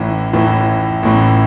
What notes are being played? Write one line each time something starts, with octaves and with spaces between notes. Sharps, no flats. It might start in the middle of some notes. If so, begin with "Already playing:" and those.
Already playing: A1 A2 E3
A1 A2 E3
A1 A2 E3